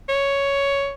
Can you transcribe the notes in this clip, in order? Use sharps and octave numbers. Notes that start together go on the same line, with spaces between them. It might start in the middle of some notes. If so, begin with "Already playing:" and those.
C#5